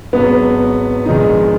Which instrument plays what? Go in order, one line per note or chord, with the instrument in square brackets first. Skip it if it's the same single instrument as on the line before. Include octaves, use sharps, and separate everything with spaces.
[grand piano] G#1 G#2 F#3 [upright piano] B3
[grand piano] A#1 G#2 D#3 G#3 D#4